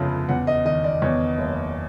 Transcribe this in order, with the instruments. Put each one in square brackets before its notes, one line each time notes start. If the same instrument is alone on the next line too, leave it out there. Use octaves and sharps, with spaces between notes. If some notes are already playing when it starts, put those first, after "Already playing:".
Already playing: [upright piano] G1 F2 C#3
E2 F#5
D#5
D#3 D#5
D5
E2 C#5
F#1